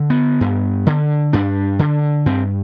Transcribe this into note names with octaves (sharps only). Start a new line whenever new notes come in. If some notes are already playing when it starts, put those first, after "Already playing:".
Already playing: D3
B3
G2
D3
G2 D4
D3
G2 C4